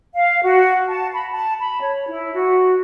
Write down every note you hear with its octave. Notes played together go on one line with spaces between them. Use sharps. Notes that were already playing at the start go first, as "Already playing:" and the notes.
F5
F#4
A5
B5
A5
B5
C#5
E4
F#4